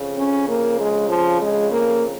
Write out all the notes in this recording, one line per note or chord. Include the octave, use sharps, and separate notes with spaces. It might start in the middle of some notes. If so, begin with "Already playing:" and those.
Already playing: F2 C#3
C#4
A#3
G#3
F3
G#3
A#3